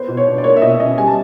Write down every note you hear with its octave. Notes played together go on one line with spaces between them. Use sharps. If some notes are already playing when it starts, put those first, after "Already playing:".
Already playing: B3 C5
B2
C#5
D4
D5
A#3 C#5
E5
B2 D#5
E5
C#4 D#5
G3 G#5
A5